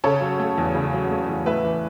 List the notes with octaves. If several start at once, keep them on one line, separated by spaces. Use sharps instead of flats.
C#3 A4 C#5
F#3
A3
E2
C#3
F#3
A3
E2
A2 B4 E5
E3